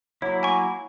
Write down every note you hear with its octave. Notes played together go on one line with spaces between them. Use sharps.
F#3 A#3 E4 C#5
G#5 C#6